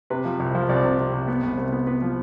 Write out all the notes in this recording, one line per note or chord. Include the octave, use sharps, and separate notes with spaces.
C3 B4
F3
C2
F3
C2 D5
C3
C3
C2
B3
C2
C2
B3
B3 B4
F3